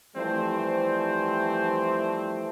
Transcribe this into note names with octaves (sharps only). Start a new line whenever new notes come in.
E3 F3 G3 A3 C4 C5